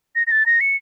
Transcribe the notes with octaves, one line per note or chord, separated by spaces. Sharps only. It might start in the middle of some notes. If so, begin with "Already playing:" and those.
A#6
A#6
A6
A#6
C#7